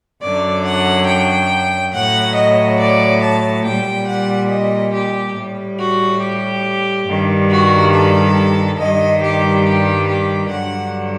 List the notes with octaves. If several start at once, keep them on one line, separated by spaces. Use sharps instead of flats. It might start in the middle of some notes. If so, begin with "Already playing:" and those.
F#2 D3 F#3 D5
F#5
G5
A2 F#3 F#5
D#5
D5
A5
A#2 G3 G5
F#5
D#5
G4
A2 G3
F#4
G4
G2 D#3 G3
F#4
A4
G2 D#3 G3 D#5
G4
G4
G4
G2 D3 F#3 F#5